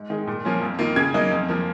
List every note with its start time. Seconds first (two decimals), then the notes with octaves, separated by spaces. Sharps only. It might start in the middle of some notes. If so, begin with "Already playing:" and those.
Already playing: G#2
0.10 D#3 G#3
0.27 A#2
0.45 F3 A#3 C#4 F4
0.61 F2
0.79 D#3 A#3 F4
0.96 C#3 G#6
1.14 F#3 A#3 D#4
1.31 F2
1.48 F3 A#3